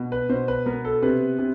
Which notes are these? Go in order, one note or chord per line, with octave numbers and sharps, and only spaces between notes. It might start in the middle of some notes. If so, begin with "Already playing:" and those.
Already playing: B2
B4
B2 C5
B4
B3 A#4
A4
C3 B4
C3